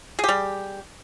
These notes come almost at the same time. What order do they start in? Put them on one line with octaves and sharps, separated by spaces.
G#4 G4 G3